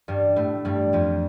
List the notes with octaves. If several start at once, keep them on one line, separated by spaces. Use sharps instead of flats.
G2 G3
A2 A3
G2 G3
F2 F3